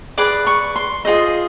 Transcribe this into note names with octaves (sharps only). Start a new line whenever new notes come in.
G#4 B4 D5 D6
C#6
C6
F4 G#4 C5 D#5